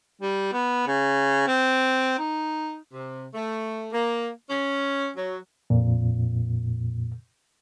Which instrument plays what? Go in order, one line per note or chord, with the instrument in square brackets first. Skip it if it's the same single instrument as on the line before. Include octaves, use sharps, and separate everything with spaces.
[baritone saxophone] G3
B3
C#3
C4
D#4
[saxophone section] C3
A3
A#3
C#4
F#3
[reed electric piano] F2 A#2